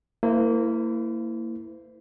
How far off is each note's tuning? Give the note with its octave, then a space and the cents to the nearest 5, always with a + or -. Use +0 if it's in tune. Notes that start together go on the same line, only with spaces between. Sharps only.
A#3 -25 E4 +0 C5 -45